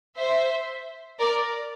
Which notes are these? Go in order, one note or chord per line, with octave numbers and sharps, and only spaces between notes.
C5 E5
A#4 D5